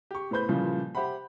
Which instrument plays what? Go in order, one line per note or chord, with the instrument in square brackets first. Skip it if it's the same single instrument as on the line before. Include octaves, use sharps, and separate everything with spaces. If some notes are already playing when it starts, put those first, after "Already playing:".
[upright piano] G4 C#6
A2 B3 B4 C5 B5 G6
A#2 C#3 E3 F3 G3
G4 C5 E5 F#5 B5